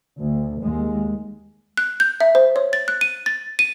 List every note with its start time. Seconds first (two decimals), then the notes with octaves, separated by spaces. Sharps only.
0.18 D2
0.62 D#2 G#3
1.77 F#6
2.00 G6
2.21 E5
2.35 C5
2.56 C#5
2.73 A6
2.88 F#6
3.01 D#7
3.26 A6
3.59 D#7